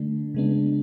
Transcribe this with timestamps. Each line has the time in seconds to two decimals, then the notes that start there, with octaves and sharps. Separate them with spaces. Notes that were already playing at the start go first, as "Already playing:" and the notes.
Already playing: D3 A3 D4
0.34 C#3 G#3 B3 D4